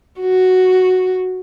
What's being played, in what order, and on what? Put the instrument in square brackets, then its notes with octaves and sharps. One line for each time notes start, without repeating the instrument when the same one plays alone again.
[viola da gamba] F#4